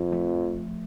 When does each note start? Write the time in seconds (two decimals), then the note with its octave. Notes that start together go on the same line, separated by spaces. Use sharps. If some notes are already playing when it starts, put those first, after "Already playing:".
Already playing: F2
0.12 F3 A3